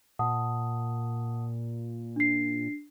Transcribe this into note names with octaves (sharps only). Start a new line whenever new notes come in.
A#2 F#5 A5 D#6
D4 C7